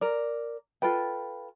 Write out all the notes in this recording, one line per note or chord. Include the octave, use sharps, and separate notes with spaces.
A#4 D5
F4 A4 B4 G5